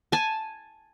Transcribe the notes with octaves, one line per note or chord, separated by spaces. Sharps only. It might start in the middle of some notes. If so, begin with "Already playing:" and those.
G#5 A5